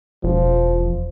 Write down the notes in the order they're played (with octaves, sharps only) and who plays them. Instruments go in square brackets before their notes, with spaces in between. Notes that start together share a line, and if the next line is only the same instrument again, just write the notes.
[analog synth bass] E1 [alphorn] F3